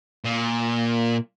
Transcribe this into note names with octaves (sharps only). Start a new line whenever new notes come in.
A#2